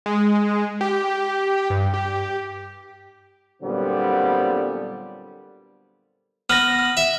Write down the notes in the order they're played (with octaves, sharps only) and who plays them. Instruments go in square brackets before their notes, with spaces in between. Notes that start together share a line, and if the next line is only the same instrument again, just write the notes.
[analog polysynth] G#3
G4
G2
G4
[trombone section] A#2 D3 F#3 G3 B3 C4
[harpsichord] B3 [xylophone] F6 A#6
[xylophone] F6
[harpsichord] E5